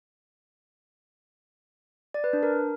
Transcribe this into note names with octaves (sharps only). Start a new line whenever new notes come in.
D5
B4
D4
A#4